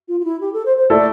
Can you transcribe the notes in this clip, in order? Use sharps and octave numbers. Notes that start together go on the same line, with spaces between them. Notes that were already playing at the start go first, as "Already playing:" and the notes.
F4
F4
E4
G4
A4
C5
C5
A3 E4 A4 D5